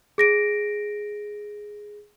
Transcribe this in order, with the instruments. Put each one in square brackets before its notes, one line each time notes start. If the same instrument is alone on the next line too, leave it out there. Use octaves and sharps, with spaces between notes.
[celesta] G#4 A#6 D7